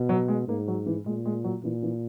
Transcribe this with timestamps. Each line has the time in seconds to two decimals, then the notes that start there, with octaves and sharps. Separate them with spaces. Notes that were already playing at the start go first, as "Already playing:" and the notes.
Already playing: B2
0.09 F#3
0.28 G#3
0.48 G#2 A#3
0.68 F#3
0.86 E3
1.06 A#2 G#3
1.25 G#3
1.44 F#3
1.63 A#2 E3
1.83 E3